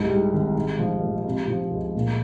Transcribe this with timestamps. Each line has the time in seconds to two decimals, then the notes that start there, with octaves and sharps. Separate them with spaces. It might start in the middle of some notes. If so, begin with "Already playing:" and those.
Already playing: C2 G#2
0.09 G3
0.33 G#1
0.55 G#2
0.79 F3
1.02 A#1
1.25 C3
1.48 F3
1.71 C#2
1.95 A#2